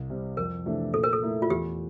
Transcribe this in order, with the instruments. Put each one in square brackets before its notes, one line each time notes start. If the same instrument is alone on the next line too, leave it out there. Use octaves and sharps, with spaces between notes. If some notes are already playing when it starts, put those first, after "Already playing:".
Already playing: [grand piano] C2
C3 G3
[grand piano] F2 [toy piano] A#4
[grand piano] C3 E3 A3 D4
[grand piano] A#2 [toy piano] A4
[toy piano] A#4
A4
[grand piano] A3 E4 A#4
[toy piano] F4
[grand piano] E2 [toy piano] G4